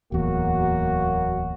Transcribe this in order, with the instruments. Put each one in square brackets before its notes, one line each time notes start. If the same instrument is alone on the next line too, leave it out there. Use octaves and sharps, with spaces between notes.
[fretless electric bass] D1 E2 [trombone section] F#3 A#3 F#4